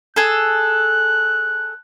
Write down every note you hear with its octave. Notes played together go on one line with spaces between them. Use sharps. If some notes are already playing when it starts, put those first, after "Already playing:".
G#4 A4 F#6